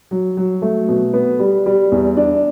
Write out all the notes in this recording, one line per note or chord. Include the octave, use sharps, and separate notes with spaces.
F#3
F#3
A3
B2
B3
G3
G3
E2
D4